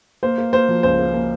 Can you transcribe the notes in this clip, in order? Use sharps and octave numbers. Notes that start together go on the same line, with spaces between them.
A#3 C5
A#3
A#3 C5
F3
C#2 C5
A#3
A#3